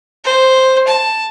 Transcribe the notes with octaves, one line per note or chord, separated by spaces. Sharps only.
C5
A5